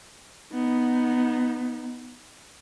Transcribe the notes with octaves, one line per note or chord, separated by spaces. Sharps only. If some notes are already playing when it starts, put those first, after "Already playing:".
B3 D#4